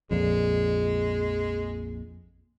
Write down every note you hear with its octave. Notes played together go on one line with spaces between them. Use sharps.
A#1 F2 A#2 G#3